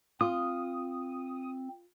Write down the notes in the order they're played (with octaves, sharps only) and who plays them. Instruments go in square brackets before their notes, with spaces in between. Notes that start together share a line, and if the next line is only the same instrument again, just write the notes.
[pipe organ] C4 [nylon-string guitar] F4 [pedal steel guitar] D#6